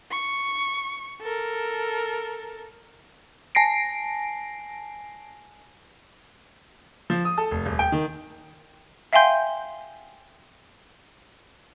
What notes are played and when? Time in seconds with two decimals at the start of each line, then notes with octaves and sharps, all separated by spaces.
0.11 C#6
1.22 A4 A#4
3.55 G#5 A5 A#6 C7 D7
7.10 F3
7.25 D#6
7.38 A4
7.51 F1
7.66 D#1
7.79 G5
7.92 D#3
9.13 E5 F5 G5 G#5 C6 G6